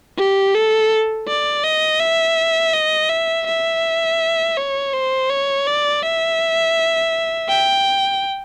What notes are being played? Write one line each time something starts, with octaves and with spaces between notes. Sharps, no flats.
G4
A4
D5
D#5
E5
D#5
E5
E5
C#5
C5
C#5
D5
E5
G5